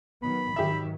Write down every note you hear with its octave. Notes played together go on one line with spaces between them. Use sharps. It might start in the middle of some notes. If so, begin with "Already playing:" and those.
D#3 F#3 B3 B5
G#2 D#3 F#3 G4 E5